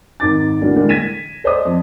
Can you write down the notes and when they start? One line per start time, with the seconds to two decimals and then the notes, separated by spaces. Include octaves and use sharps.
0.20 G#1 G#2 D#4 D6 A6
0.61 D3 E3 G3 A#3 D4 F#4
0.76 A2 D3 E3 G3 G#3 A#3
0.89 G#6 A#6 B6 D#7 E7
1.44 A4 C5 D5 D#5 D#6
1.65 F2